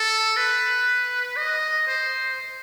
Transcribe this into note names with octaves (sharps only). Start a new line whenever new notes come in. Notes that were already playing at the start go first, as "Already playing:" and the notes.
Already playing: A4
B4
D#5
C5